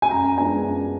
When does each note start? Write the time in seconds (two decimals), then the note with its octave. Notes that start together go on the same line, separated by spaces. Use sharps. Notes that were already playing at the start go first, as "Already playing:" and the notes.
0.02 G#5
0.11 F#2 A#5
0.37 F3 G#3 B3 D4 G#5
0.64 F#2